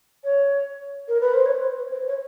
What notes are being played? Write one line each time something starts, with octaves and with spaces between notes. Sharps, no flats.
C#5
A#4
B4
C5
C#5
C5
B4
C5
C#5